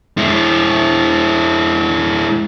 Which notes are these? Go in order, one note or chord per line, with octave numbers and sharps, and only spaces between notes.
G#3 E4